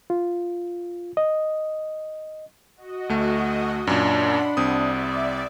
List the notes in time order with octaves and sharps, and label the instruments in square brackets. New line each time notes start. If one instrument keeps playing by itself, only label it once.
[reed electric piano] F4
D#5
[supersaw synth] F#4 D#5
[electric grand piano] D2 A3
[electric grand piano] F#2 A#2 [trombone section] D4 [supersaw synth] F#5 B5 C6
[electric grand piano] C2 C4 D#6 [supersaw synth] D5 E5